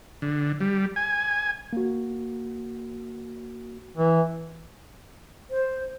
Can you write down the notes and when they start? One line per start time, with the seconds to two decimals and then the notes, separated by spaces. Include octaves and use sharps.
0.22 D3
0.61 G3
0.96 G#5
1.73 A#3 F#4
3.97 E3
5.51 C5